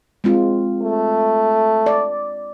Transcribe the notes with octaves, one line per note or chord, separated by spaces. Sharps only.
G#3 C4 F4
A3
D5